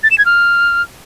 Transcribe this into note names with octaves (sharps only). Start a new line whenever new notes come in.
A6
E7
G#6
F6